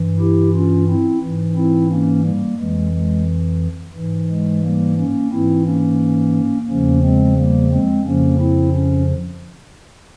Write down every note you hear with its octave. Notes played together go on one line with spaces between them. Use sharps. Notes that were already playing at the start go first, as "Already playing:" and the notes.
Already playing: G2 E3
E4 G4
C#4 F4
C4 E4
G#2 E3
C4 E4
A#3 C#4
G3 A#3
F2 E3 G#3
G#3
G#2 E3
G#3
G3 A#3
A#3 C#4
G#2 E3 C4 E4
A#3 C#4
E2 C#3 F3 A#3 C#4
G#3 C4
G3 A#3
G#3 C4
F2 C#3 F3 A#3 C#4
C4 E4
C#4